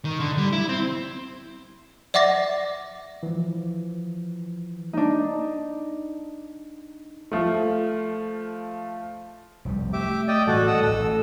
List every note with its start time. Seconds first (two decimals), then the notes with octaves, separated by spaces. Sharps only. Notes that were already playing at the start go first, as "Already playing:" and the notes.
0.05 D#3
0.20 D3
0.38 G3
0.52 E4
0.69 C4
2.14 D5 E5 F#5 D6 A6 A#6
3.23 E3 F3
4.93 D4 D#4
7.32 F3 A3
9.65 F1 C2 G3
9.93 A3 G4 E5 D6
10.28 D5 D#5 G5
10.47 A2 E3 G3 F#4 A4 D5
10.67 D#5 F#5 E6
10.83 A1 A2 A4 E6